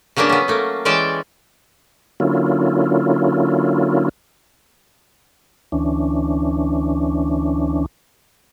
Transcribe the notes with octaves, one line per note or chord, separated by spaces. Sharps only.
C#3 F#3 A#3 B3 D4
B3 C#4
A3 A#3
E3 G#3 C#4 D5 G5 A5
D3 F#3 A#3 C#4 E4 F4
D2 E3 C#4 D4